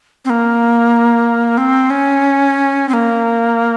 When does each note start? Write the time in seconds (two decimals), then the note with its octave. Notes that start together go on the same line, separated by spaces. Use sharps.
0.25 C4
0.30 A#3
1.58 C4
1.90 C#4
2.89 C4
2.93 A#3